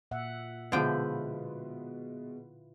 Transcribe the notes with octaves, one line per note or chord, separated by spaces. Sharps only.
A#2 E5 F#5
B2 D3 F3 G#3 E4 F4 B4 G5